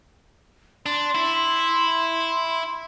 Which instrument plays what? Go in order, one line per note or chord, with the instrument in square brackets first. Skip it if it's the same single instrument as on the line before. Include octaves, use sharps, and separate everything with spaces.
[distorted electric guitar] D4 [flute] C6
[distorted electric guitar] E4